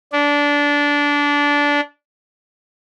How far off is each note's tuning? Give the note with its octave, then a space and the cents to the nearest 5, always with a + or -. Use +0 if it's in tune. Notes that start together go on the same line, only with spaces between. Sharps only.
D4 -20